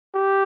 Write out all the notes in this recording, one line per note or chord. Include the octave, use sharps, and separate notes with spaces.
G4